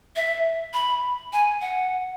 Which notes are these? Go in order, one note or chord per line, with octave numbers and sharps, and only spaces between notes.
E5
B5
G#5
F#5